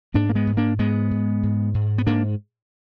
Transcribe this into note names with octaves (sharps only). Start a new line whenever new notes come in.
G#2 A#3 D4
A#3
G#3 B3
G#2
A#3 D4
G#2 G#3 B3
G#2
G#2
G#2
B3
G#2 A#3 D4